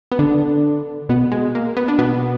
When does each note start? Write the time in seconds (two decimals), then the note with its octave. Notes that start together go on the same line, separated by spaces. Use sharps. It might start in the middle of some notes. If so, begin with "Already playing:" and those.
0.12 B3
0.19 D3 D4
1.09 B2 B3
1.32 G#3
1.55 A#3
1.77 B3
1.88 D4
1.99 B2 B3